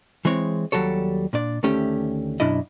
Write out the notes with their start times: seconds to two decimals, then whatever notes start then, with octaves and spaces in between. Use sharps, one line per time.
0.25 E3 G#3 C4 C#5
0.72 D#2 F#3 G3 A4 C#5
1.33 A#2 D4 D5
1.63 D2 D#3 A3 C#4 G4
2.40 F#2 B2 D4 E4 D#5